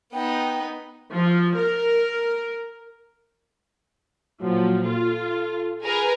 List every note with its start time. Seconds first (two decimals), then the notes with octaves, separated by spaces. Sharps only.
0.14 B3 D#4 G5
1.14 F3
1.58 A#4
4.41 A#2 F3 F#3
4.86 F4 A4
5.83 G#4 A#4 B4